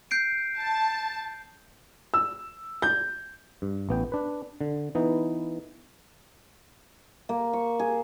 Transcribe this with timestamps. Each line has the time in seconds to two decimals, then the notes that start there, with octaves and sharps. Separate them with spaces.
0.11 G6 C7 D7
0.59 A5
2.14 E6
2.82 G6
3.62 G2
3.89 A1 B3 G5
4.12 D4 B4
4.61 D3
4.95 E3 B3 D#4
7.29 A#3
7.53 C#6
7.79 G#4